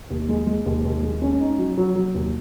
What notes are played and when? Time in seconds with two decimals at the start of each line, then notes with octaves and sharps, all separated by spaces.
0.10 D#2
0.29 G#3
0.47 G#3
0.66 D#2
0.85 D#2
1.03 G#3
1.22 C#4
1.40 D#4
1.59 F#3
1.77 F#3
1.96 F#3
2.15 D#2